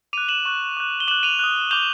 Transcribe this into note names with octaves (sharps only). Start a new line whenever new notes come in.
D6 F#6 D#7 F7
E7 F#7
C#6 F#6
D6 F#6
G7
D6 F#6 E7 F#7
D#7 F7
D#6 F#6
D6 G6 F7 G7